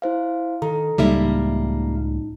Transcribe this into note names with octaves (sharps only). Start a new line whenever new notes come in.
E4 C5 F5
D#3 A4 A#5
C#2 A2 G3 A#3 D#4 E5